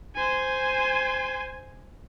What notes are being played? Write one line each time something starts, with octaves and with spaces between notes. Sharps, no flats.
C5 G#5